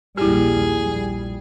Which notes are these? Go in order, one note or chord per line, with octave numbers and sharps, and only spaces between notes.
A#1 D#2 G3 E4 G4 G#4
A#1 G3